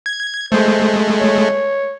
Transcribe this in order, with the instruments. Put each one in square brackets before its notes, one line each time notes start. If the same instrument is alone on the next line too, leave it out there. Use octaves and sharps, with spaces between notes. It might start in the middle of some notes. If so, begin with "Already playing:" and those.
[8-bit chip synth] G#6
[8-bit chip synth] G#3 A3 [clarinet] C5
[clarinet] C#5